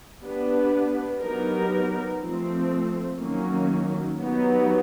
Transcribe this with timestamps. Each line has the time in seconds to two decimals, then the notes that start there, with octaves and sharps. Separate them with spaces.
0.22 B3 D4 G4 B4
1.21 F#3 B3 D#4 G4 A#4
2.20 F3 A3 C4
3.19 D#3 F#3 A#3 C#4
4.19 F#3 B3 D#4 G4